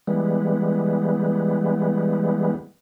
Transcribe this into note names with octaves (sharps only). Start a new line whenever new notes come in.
E3 G3 G#3 B3